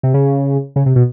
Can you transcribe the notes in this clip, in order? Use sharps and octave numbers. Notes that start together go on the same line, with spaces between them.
C3
C#3
C#3
C3
B2